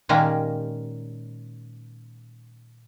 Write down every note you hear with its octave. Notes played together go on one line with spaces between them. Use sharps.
A#2 D#3 G#3 A#3 C#4 G4